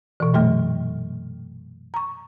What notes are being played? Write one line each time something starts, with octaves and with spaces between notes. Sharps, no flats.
B2 E3
F#2 A#2 F#3 A3 G5 F6
A#5 C#6